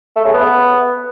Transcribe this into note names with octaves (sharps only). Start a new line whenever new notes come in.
A3
C#3
B3